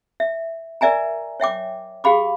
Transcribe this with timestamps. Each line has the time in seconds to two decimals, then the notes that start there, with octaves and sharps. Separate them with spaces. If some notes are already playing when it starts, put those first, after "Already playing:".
0.20 E5
0.81 A#4 D5 E5 G#5 A#5
1.40 C#5 E5 G5 D6
2.04 G4 G#4 F5 B5 D6